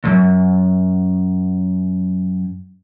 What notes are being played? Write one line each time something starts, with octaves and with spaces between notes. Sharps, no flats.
C#2 F#2